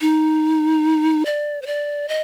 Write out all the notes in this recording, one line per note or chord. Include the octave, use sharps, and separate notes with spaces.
D#4
D5
C5
D5
D#5